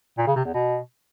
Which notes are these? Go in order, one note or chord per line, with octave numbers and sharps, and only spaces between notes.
A#2
C#3
C3
E2
B2